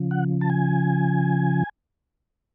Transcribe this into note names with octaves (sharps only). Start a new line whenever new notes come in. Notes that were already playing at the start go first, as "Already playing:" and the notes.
Already playing: C#3 F3
F#5
A5
G#5